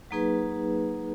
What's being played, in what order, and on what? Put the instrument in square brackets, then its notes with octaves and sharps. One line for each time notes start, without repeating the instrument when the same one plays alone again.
[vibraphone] F#3 A#3 D#4 G#4 B4